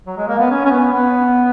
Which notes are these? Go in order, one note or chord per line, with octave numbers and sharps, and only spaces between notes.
F#3
G#3
A#3
B3
C#4
C#4
B3
B3